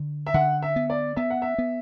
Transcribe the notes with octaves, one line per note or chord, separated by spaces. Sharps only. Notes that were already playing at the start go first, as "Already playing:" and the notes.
Already playing: D3
E5
D3 F#5
E5
B3
D5
B3 E5
F#5
E5
B3